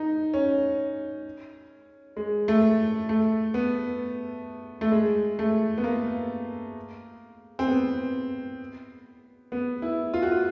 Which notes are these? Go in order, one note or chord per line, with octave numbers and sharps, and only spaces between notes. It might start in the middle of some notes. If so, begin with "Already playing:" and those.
Already playing: D#4
C#4
G#3
A3
A3
B3
A3
G#3
A3
B3
A#3
C4
B3
B3
E4
F4
F#4
F4